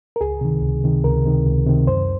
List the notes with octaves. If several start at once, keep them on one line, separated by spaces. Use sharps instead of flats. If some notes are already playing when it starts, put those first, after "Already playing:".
A#4
C#2 G#4
C3 D#3
C#2
C3 D#3
C#2 A#4
C3 D#3
C#2
C3 D#3
F#2 C5